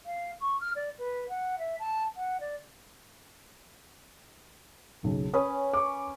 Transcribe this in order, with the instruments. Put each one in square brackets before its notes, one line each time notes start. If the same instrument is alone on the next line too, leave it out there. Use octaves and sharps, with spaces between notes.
[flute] F5
C#6
F6
D5
B4
F#5
E5
A5
F#5
D5
[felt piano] F#1 B1 C#3
[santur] C#4 B4 [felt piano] D#6
[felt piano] C#6 D6